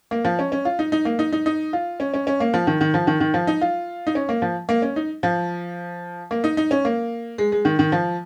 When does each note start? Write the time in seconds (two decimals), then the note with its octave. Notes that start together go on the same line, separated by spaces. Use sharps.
0.11 A#3
0.25 F3
0.39 C#4
0.52 C#4
0.65 F4
0.79 D#4
0.92 D#4
1.05 A#3
1.19 D#4
1.32 D#4
1.46 D#4
1.73 F4
2.00 C#4
2.14 C#4
2.27 C#4
2.40 A#3
2.54 F3
2.67 D#3
2.81 D#3
2.94 F3
3.07 D#3
3.20 D#3
3.34 F3
3.47 D#4
3.61 F4
4.07 D#4
4.15 C#4
4.29 A#3
4.42 F3
4.69 A#3
4.82 C#4
4.96 D#4
5.23 F3
6.31 A#3
6.44 D#4
6.57 D#4
6.71 C#4
6.85 A#3
7.38 G#3
7.52 G#3
7.65 D#3
7.79 D#3
7.92 F3